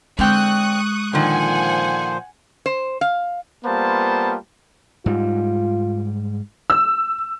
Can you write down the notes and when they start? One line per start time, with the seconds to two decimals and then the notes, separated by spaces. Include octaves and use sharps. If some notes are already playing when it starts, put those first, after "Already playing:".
0.19 D3 G#3 C4 G5 C#6 D#6 F#6
1.13 A#2 D3 D#3 F3 C5 F#5 G#5
2.66 C5
3.01 F5
3.64 G3 A#3 B3 F4 C5 A5
5.06 G#2 G3 F4
6.70 E6